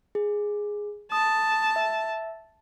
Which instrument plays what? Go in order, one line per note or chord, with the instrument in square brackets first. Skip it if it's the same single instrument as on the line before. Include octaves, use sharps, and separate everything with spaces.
[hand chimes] G#4
[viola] A5 [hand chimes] D#6
[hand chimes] E5